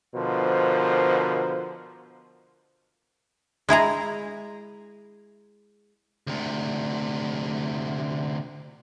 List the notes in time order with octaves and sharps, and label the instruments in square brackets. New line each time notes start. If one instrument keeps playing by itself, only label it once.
[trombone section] B2 D3 F3 A#4 C5
[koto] G#3 E4 G#4 A#5
[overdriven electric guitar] D2 C3